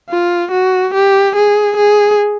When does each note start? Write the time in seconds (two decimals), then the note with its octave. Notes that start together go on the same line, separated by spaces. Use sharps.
0.10 F4
0.52 F#4
0.94 G4
1.36 G#4
1.77 G#4